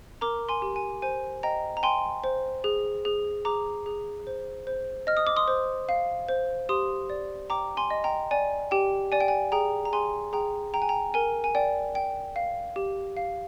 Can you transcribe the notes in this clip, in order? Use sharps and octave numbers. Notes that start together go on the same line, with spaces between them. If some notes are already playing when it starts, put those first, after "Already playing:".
A#4 A#5 D6
G#5 C6
G4
G#5
C5 G#5
D#5 G5 A#5
A#5
G5 G#5 C6
C5
G#4
G#4
G#4 A#5 D6
G#4
C5
C5
D#5 F6
D#6
D6
C6 D#6
C5
F5
C5
G4 C6 D#6
D5
G5 A#5 D6
G#5 C6
D#5
G5 A#5
D5 G#5
G4 G5
D5 G#5
G5
G#5
G#4 G5 A#5
A#5
G#4 G#5 C6
G#4 G5 A#5
G5 A#5
G#5
G5 A#5
A#4 G#5
G#5
D5 G5
G5
F5
G4
F5